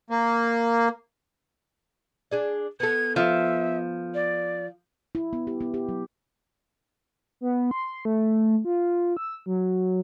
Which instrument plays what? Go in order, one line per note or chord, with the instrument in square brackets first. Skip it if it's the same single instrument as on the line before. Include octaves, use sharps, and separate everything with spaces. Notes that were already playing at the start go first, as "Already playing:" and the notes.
[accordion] A#3
[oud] D4 G#4 D5
[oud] B3 A4 [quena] G#6
[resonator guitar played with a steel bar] F3 [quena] E5
[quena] D5
[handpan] E4
B3
G4
B3
G4
F#3
[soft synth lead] B3
C6
A3
F4
E6
F#3